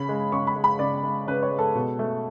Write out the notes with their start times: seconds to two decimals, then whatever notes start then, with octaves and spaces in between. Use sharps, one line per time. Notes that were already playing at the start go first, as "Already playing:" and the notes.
Already playing: C#3 B5
0.09 G#3
0.32 C#3 C#6
0.47 B5
0.56 G#3
0.64 B5
0.79 C#3 D5
1.03 G#3
1.27 C#3 B4
1.43 C#5
1.51 G#3
1.59 A4
1.75 B2
1.99 A3